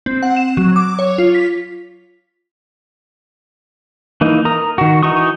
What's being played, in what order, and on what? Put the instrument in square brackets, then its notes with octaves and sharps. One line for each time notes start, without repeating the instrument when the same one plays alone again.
[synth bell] C4
F#5
E7
F#3
D6
C#5
F4
B6
[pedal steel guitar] E3 A#3 D#4
A#4 A#5 D#6
D#3 F#4
E3 D#4 F#4 C#6 D#6